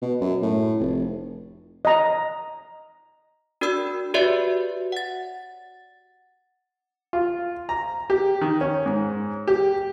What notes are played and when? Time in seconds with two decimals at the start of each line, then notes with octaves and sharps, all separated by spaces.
0.02 B2
0.21 F#2
0.43 A2
0.79 F1
1.85 D#5 A#5
3.61 D4 F#4 A#4 D5 B5 E6
4.14 F#4 G4 B4 C#5 D5 E5
4.92 F#5 A6
7.13 F4
7.69 A#5
8.10 G4
8.41 D#3
8.61 C#4
8.86 G#2
9.47 G4